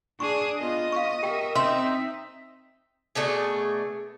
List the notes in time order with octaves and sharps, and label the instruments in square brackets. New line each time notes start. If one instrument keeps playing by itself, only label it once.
[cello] D4 G#4 [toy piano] C#6
[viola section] B3 F4 [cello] D#5
[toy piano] F5 C#6
[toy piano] G4 G5 [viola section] A#4 E5
[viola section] C4 D#4 D#5 [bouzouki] E5 [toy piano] C6 E6
[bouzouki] B2 A3 D4 G#4